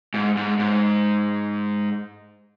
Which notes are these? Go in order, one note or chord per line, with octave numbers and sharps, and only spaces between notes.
G#2
G#2
G#2